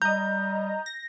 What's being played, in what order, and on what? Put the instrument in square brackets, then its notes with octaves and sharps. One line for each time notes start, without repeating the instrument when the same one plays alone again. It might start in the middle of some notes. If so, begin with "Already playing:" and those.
[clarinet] G3 [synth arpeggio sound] D#5 A#5 [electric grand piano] G6
[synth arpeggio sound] A#6